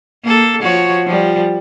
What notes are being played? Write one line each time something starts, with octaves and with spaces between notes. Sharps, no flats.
A#3 A4
F3 F#4 C#5
F3 G3